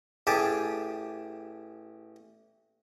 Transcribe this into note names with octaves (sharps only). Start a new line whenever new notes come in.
A1 G4 G#4 A5 D6